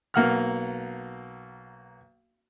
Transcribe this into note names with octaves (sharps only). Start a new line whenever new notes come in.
B1 A#3 F#5 F6